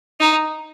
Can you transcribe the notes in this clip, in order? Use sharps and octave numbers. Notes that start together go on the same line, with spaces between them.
D#4